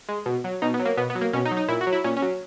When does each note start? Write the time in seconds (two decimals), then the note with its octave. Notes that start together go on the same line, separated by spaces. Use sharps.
0.09 G#3
0.26 B2
0.44 F#3
0.62 B2 D#4
0.74 B3
0.80 F#3
0.85 A#3
0.97 B2 B3
1.10 B3
1.15 F#3
1.21 A#3
1.33 B2 C#4
1.45 D#4
1.51 F#3
1.57 D#4
1.68 A#2 E4
1.81 F#4
1.87 F#3
1.92 E4
2.04 A#2 C#4
2.17 C#4
2.22 F#3